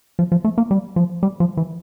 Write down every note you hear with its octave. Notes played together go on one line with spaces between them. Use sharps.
F3
F3
A3
A#3
G3
F3
G3
F3
E3